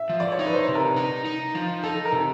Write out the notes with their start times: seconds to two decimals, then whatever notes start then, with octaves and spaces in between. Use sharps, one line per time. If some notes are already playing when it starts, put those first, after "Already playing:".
Already playing: E5
0.10 F3
0.20 D5
0.32 C#5
0.39 D#4
0.47 B4
0.53 C5
0.68 C3
0.75 A#4
0.96 D#4
1.25 D#4
1.55 F3
1.83 D#4 A4
2.05 A#4
2.12 C3